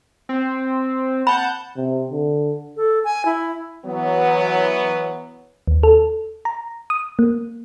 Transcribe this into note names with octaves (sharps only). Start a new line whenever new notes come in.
C4
F#5 A5 B5 G6
C3
D3
A4
G#5
E4
E3 F#3 B3
D#2
A4
A#5
D#6
A#3